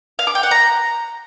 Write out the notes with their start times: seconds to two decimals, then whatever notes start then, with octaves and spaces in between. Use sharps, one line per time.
0.19 F5
0.27 D6
0.35 G5
0.43 F#5
0.51 A#5